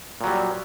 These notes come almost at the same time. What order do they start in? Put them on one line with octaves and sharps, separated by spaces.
A#2 F#3 G3